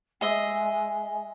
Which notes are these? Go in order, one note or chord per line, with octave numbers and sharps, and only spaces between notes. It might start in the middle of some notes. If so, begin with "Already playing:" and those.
G#3 G#4 D#5 E5